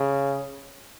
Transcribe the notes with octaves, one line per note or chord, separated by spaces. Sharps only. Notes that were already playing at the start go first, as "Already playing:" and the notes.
Already playing: C#3